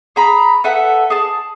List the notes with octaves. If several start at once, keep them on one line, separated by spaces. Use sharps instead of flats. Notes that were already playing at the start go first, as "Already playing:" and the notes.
G#4 A#5 B5
A4 B4 E5 F#5
G#4 A5